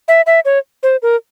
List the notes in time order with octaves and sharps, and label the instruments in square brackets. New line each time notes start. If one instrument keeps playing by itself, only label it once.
[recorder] E5
E5
C#5
C5
A#4